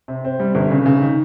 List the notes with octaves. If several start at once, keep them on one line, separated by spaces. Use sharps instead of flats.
C3
C4
G3
G1
C#3
C#3
D#3